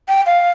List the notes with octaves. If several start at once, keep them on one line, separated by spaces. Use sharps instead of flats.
G5
F5